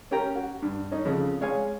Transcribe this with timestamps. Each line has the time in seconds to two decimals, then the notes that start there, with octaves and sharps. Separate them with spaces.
0.11 C#4 G4 A#4 G5 A#5
0.35 F#4
0.62 G2
0.91 C#4 D#4
1.05 F2 C#3
1.41 G#3 C#5 F5 G#5